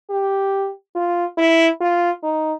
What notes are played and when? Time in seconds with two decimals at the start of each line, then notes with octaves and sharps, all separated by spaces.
0.10 G4
0.96 F4
1.38 E4
1.81 F4
2.23 D#4